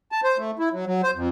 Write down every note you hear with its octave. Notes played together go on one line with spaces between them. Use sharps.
A5
C5
A3
E4
F#3
F#3
C5
F2